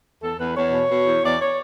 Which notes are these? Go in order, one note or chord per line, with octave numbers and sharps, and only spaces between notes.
E2 A4
E2 B4
E2 C#5
B2
B2
E2
E2 D5
C#5